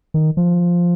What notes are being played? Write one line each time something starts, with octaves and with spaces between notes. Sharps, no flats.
D#3
F3